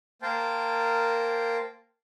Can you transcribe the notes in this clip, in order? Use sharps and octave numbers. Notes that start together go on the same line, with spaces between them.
A#3 A#4 C5 G5 A5